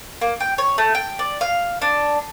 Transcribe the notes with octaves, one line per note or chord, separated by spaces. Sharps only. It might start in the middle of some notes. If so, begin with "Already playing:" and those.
A#3
G5
C#5
A3
G5
D5
F5
D4